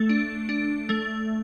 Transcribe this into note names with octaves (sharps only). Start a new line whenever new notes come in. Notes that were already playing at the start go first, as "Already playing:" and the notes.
Already playing: A3 A4
D4
D4
A3